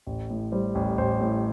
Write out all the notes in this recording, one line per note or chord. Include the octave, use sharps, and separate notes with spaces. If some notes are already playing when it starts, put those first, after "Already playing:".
A1
A2
G3 C5
A1
A1 C5
A2